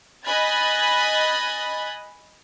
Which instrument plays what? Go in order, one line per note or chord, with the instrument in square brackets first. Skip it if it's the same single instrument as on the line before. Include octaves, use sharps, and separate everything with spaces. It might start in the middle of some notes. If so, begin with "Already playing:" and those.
[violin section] D#5 G#5 B5 F#6 G#6 A6